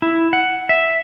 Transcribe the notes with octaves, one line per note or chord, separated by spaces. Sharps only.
E4
F#5
E5